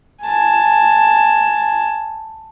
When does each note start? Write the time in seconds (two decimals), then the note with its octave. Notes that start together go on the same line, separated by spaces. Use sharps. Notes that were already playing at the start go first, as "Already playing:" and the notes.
0.23 G#5 A5